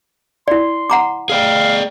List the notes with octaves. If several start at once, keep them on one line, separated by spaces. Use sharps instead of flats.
E4 D5 C6
F#5 A#5 D6
G#4 D5 F5 G5